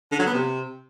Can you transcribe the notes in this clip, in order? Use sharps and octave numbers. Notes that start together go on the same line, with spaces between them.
D3
F#3
B3
C3